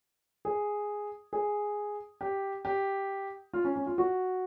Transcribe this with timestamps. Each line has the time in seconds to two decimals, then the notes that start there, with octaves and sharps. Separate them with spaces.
0.45 G#4
1.33 G#4
2.21 G4
2.65 G4
3.53 F4
3.65 C#4
3.76 C#4
3.87 F4
3.98 F#4